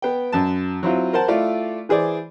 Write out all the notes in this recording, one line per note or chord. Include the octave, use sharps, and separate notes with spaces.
B3 G5
F#2 A5
F#3 C4 E4 F4
A#4 C5 F#5 A5
A3 E4 F4 D5 F5
E3 G#4 C5 D5